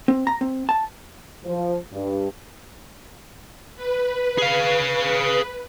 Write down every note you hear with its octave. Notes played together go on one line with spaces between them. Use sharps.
C4
A#5
C4
A5
F3
G2
B4
G#4 F5